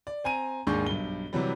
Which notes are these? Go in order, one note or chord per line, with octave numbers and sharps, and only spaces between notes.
D5
C4 G#5 A#5 D#7
D#2 G#2 D4 G#4 C#6 G6
B1 G2 G7
C3 E3 F#3 G3